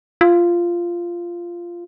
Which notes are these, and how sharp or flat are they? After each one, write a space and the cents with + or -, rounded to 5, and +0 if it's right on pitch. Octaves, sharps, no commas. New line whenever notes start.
F4 -10